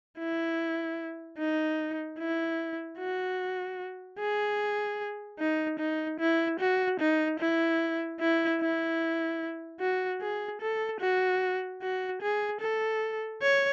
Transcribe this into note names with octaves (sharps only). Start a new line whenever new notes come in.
E4
D#4
E4
F#4
G#4
D#4
D#4
E4
F#4
D#4
E4
E4
E4
F#4
G#4
A4
F#4
F#4
G#4
A4
C#5